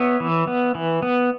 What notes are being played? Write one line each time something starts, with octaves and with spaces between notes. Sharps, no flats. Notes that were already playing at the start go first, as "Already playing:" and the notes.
Already playing: B3 C#5 E5
E3
B3
E3
B3